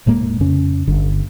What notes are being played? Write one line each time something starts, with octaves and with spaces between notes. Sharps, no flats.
D#1 A2 G#3 A#3
F2 C#3 C#4
G1 D3